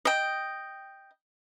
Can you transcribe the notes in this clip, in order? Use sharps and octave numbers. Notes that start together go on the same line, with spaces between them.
D#5 G5